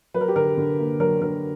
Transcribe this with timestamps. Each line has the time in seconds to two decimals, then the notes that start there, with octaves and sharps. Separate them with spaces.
0.14 F#3 B4
0.21 A#4
0.28 G4
0.36 D3 A#4
0.57 D3
0.79 A#3
1.00 F#3 A#4
1.21 D3 A#4